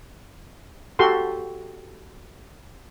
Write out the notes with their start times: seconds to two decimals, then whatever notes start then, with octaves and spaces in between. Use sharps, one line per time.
0.99 F#4 G4 A4 C6